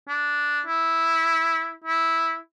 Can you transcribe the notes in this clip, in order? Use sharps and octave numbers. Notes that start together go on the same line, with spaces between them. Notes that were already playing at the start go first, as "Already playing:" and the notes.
D4
E4
E4